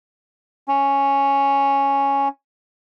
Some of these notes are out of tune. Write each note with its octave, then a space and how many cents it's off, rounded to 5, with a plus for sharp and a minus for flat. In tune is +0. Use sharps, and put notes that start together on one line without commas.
C#4 +0